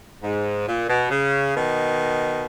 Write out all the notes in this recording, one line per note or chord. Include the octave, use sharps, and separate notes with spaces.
G#2
A#2
B2
C#3
B2 D#3